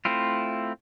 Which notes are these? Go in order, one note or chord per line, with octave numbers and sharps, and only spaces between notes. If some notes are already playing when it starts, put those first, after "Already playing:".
A3 C4 E4 F4